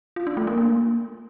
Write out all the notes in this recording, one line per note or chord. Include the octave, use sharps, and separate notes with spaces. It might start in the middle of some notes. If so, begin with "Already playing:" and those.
F4
D4
A3
A#3
A#3